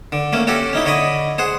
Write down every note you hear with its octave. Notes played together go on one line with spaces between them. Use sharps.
D3
A3 A#3 C#4
C#4 F#4 G4 A4 C#5
C#4 D#4 E4
D3 C#5 D#5 B5 D#6
G#4 C5 F#5